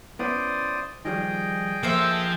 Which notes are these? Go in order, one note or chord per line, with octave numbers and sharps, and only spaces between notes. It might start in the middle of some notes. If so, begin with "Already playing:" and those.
B3 C#4 E4 C5 D5 D#6
D#3 F3 G3 G#4 D#5 G5
F3 A#3 A4 C5 E5